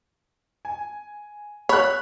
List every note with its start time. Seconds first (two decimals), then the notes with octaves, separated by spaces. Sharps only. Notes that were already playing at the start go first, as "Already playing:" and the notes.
0.65 G#5
1.69 C#5 B5 F6 F#6